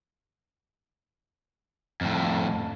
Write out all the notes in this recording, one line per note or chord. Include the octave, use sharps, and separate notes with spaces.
F2 A2